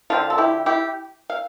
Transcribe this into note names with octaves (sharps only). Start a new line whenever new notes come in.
D3 F3 C4 F4
A4
E4 G4
E4 G4
F5